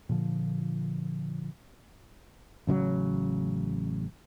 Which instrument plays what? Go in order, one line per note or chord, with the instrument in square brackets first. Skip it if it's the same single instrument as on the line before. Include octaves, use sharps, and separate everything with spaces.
[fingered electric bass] A#2 D3 F3
[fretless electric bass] A1 C#3 E3 F#3